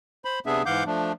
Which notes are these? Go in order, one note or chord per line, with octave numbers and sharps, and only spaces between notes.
C5 B5
C3 B3 D4 G#4 E5
G#2 E3 F5 F#5 D6 G6
F3 A3 D4